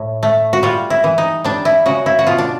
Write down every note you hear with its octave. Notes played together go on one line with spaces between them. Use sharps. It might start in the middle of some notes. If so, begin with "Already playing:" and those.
Already playing: A2
A3
F#4
G3 F4
E4
E3
D#4
G3 D4
E4
C#3 F#4
E4
F#4
B2 F4
D4